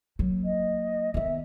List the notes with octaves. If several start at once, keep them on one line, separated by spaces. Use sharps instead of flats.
F#3 A#3
D#5
D#3 B3 E5